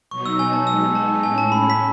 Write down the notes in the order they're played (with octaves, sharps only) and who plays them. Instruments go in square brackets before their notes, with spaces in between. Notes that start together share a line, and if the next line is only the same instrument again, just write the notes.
[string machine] B2 F#3 B3 D#4 [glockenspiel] C#6
[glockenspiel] E6
G#5
A5
[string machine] G#3 B3 D#4 [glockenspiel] E6
[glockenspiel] A5
[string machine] A2 G#3 C#4 [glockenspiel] G#5
[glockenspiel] A5
B5
B6